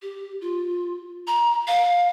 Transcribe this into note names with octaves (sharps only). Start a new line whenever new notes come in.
G4
F4
A#5
F5